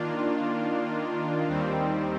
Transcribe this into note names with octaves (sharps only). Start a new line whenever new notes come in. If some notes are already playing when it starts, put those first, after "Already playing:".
Already playing: D#3 A#3 D4 F4
D#2 D#3 G3 C4